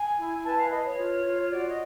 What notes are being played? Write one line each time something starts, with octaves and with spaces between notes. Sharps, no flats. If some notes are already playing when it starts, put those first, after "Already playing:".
Already playing: G#5
E4
B4 A5
F5
B4 D#5
C#5
F4
F4
C#5
F#4 D5
D#5